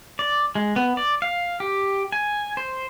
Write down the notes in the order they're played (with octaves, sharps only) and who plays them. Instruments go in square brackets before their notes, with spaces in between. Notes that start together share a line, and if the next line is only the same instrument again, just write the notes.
[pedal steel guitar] D5
G#3
B3
D5
F5
G4
G#5
C5